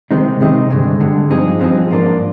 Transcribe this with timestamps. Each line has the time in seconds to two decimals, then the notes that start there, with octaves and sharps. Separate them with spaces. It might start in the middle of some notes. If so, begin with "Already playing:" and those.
0.11 C3 D#3 G#3 C4 D#4
0.40 C3 D#3 G#3 C4 D#4
0.70 G2 D3 G#3
1.00 G2 D3 G#3
1.30 G2 F3 C4 D#4 G#4
1.59 G2 F3 C4 D#4 G#4
1.90 G#2 F3 A#3 D4 F4